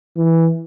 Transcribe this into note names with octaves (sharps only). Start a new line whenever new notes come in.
E3